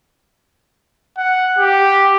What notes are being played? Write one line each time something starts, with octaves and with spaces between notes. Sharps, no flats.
F#5
G4